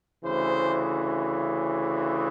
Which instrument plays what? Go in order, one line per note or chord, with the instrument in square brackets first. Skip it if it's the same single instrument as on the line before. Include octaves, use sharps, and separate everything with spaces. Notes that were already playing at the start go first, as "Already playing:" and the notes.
[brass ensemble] D2 C#3 E3 C5